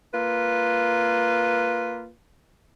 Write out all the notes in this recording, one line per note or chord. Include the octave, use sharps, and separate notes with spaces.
A#3 F4 B4